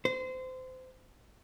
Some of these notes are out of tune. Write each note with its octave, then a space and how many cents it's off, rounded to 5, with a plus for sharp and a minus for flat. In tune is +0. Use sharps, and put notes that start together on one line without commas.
C5 -25